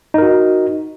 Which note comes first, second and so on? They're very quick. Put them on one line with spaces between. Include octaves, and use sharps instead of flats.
D#4 A#4 F#4